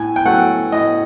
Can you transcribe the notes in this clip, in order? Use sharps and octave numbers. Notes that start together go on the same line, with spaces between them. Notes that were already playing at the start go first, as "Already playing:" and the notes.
Already playing: A2 G#5
G5
F#3 A3 F#5
A2 D#5